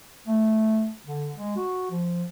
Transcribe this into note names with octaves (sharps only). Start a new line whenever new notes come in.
A3
D3
G#3
F#4
F3